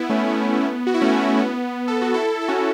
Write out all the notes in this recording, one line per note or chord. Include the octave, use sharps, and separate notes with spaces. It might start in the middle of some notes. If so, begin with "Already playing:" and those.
Already playing: B3 E4
A3 C#4
B3
F#4
E4
A3 C#4
A3
B3
A4
F#4
E4 A4
A4
C#4 F#4